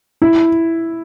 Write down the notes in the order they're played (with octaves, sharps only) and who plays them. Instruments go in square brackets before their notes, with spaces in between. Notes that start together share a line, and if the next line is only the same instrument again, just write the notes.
[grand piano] E4